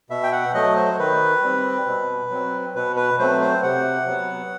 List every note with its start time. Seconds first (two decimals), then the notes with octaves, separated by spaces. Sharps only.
0.10 B2 E5
0.23 G5
0.32 F#5
0.54 F#3 A3 D#5
0.77 C5
0.99 D#3 B4
1.42 G3 C4
1.86 B2
2.30 F#3 C4
2.75 B2 B4
2.96 B4
3.19 F#3 A3 C4 C5
3.41 C5
3.63 C3 F#5
4.07 F#3 B3